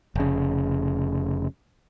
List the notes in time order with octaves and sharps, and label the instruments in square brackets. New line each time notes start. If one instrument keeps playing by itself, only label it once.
[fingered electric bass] F1 C#3